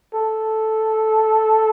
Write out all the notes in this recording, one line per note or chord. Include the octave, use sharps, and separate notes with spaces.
A4